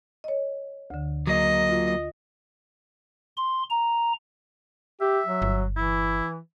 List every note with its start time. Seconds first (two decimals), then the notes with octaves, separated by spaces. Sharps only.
0.24 C#5 D#5
0.90 D2 D3
1.27 F#3 A#3 D#5
1.69 F4
3.37 C6
3.70 A#5
5.01 G4 E5
5.26 F#3
5.42 G1
5.77 E3 E4